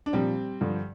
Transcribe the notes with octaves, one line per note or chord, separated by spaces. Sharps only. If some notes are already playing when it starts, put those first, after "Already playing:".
D4
A#2 F3 G3 C4
G2 D3 F3